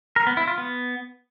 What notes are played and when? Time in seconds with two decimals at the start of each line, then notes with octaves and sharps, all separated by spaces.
0.16 A#4
0.27 B3
0.37 E4
0.47 F4
0.58 B3